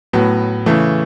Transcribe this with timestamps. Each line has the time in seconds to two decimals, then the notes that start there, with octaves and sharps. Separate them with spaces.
0.13 A2 F#3 B3
0.66 C#3 E3 A3